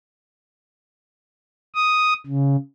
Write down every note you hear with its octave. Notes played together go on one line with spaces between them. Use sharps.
D#6
C#3